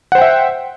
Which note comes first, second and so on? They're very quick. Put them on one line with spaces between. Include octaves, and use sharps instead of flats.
F#5 C5 G5 E5